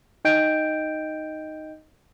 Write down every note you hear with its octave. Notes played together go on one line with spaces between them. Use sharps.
D#4 D#5 G5 G6 D7